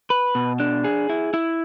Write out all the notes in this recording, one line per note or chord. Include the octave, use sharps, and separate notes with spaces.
B4
B2
D4
G#4
E4
E4